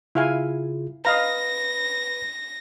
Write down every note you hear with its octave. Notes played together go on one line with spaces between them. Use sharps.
C#3 E4 F4 G#4 F5 G#5
B4 D#5 F5 A#5 B5 A#6